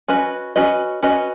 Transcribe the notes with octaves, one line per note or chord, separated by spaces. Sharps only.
C#4 F#4 B4 D#5
C#4 F#4 B4 D#5
C#4 F#4 B4 D#5